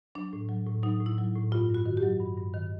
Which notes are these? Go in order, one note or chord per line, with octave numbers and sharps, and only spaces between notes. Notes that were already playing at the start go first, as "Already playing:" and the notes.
F#3 D4
A2
F#3
A2
F#3 D#4
A2
E4
F#3
A2
G2 F4
G2 F#4
D#3
G4
F#3
G2
G2
D#3